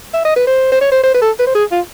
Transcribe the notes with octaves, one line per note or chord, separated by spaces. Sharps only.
E5
D#5
B4
C5
C5
C#5
C5
C5
B4
A4
B4
C5
G#4
F4